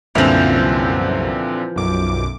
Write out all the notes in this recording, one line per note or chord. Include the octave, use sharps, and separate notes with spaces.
C2 F#2 A#2 D3 E3 F3 C4
B1 F#2 D6